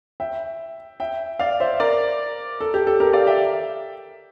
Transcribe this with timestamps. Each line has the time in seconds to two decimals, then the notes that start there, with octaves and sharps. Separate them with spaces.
0.20 E5 G5
1.00 E5 G5
1.39 D5 F5
1.60 C5 E5
1.80 A#4 D5
2.60 A4
2.74 G4
2.87 A4
3.00 G4 A#4
3.13 D5 F5
3.27 E5 G5